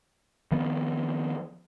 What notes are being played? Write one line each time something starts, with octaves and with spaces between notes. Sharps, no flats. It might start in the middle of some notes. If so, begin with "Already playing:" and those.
D#3 F3 B3